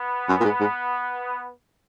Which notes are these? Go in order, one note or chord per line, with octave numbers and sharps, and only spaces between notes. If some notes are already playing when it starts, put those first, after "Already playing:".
Already playing: B3
F#2
A#2
G#2
G#2